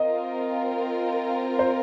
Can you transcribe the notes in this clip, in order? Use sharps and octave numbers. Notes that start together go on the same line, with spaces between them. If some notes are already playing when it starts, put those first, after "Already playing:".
Already playing: C4 F4 A#4 D#5
C5